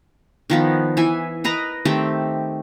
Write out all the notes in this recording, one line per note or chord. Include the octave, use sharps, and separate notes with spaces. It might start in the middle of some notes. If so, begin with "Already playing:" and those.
D#3 F3 B3
E3 E5 G#5
A#4 B4 D#5 A#5
D#3 A3 C4 G4